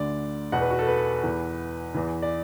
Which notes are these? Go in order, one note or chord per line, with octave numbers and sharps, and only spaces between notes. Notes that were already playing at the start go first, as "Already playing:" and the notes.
Already playing: D2 D3 D5
E2 B2 F#5
B4
F#4
A4
B4
E2 E3
E2 E3
D5